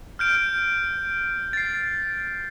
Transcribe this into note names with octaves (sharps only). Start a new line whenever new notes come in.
F6 G6 D7
A6 C7